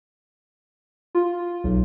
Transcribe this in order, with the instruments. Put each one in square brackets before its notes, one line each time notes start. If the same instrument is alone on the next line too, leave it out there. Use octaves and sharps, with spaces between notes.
[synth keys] F4
B1